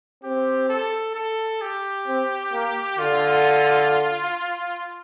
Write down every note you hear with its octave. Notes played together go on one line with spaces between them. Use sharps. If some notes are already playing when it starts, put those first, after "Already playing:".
C4 G4
A4
A4
G4
C4
A#3
D3 F4